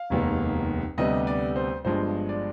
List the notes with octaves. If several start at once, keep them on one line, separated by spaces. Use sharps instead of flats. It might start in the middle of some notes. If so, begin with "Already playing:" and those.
Already playing: F5
F1 D#2 D#3 G#3 B3
D2 C3 G3 B3 D#5
D5
C5
G1 G2 F3 G#3 C5
D5